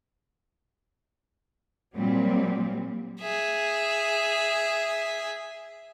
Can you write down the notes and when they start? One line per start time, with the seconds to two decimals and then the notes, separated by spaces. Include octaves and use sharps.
1.96 A#2 F#3 G3 C4
3.20 G#4 E5